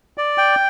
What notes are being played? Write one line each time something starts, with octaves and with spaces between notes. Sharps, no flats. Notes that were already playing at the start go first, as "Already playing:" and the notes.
D5
G5